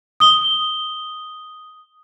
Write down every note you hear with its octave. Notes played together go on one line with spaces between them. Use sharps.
D#6 G7